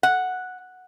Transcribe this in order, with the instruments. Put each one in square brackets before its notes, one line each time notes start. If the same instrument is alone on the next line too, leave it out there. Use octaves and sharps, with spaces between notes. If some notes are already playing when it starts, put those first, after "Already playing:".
[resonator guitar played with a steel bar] F#5